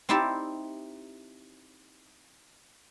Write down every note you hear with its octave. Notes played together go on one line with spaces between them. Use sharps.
C4 D#4 E4 G4 D5 E5